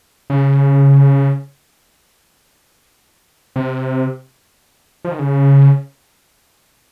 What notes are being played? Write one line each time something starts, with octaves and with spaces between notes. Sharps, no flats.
C#3
C3
F3
D#3
C#3